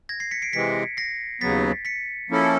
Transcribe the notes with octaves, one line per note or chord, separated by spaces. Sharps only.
G#6 A#6
A#6 C7
B6 C#7
C7 D7
C3 E3 G#3 C4 B6 C#7
A#6 C7
D#2 C#3 F#3 B3 A6 B6
B6 C#7
F3 A#3 C#4 E4 A4